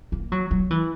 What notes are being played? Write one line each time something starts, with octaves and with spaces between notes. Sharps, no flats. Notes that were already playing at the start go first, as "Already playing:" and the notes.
A#3
F#3
F#3
E3